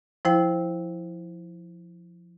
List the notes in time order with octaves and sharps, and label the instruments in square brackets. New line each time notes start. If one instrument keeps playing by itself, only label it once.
[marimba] F3 E4 C5 G5